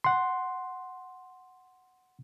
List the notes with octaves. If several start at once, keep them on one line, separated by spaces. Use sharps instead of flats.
F#5 C6